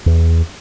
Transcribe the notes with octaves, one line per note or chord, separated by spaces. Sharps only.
E2